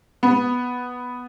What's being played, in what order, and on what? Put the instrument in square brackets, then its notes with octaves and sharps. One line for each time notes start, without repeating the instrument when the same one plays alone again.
[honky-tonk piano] B3